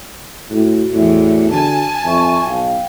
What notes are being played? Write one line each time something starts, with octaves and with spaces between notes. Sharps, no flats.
A2 F#4
E2 A2
D3 G#5 A5
F2 E5 C#6
B1 F5 G5